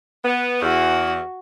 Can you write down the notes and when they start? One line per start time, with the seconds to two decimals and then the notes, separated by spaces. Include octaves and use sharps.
0.25 B3
0.62 E2 F#4